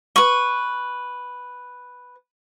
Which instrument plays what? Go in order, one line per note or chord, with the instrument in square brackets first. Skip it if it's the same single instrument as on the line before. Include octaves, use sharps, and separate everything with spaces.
[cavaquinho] B4 C#6